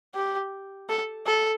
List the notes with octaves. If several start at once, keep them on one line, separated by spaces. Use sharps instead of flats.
G4
A4
A4